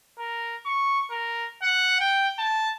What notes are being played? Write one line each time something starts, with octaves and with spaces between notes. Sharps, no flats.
A#4
C#6
A#4
F#5
G5
A5